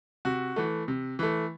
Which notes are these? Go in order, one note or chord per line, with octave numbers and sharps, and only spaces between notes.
C3 F#4
E3 A3
C3
E3 A3